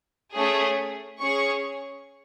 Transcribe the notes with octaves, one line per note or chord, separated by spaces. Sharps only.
A3 C#4 G#4
C#4 G#4 C#6